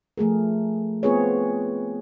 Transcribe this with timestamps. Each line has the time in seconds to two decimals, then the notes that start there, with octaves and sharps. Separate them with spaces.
0.18 F3 A3 G#4 A#4
1.03 B3 C4 F4 G#4 B4 C#5